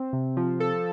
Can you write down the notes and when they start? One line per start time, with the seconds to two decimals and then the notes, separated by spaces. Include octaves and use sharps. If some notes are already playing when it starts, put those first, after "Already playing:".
Already playing: C4
0.13 C3
0.37 F3
0.60 A4